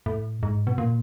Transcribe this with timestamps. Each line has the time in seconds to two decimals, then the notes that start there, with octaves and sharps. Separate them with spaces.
0.06 A2
0.43 G#2
0.67 B2
0.78 A#2